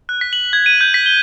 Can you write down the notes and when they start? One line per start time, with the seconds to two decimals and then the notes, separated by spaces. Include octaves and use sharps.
0.09 F#6
0.21 B6
0.33 F#7
0.53 G#6
0.66 D#7
0.81 G6
0.94 B6
1.06 G7